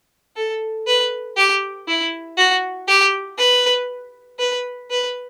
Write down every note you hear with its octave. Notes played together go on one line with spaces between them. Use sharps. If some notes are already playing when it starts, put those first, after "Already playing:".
A4
B4
G4
E4
F#4
G4
B4
B4
B4